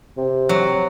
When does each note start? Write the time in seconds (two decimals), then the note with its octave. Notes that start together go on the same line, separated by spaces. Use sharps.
0.17 C3
0.49 F#3